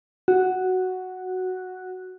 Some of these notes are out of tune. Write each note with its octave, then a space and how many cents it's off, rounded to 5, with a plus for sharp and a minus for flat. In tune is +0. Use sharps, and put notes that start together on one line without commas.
F#4 +0